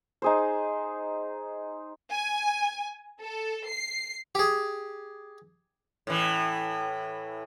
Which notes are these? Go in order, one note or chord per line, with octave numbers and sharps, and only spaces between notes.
D#4 G#4 C5
G#5
A4
C7
G4 G#4
A2 E3